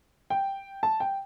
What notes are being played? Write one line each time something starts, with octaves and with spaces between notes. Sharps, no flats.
G5
A5
G5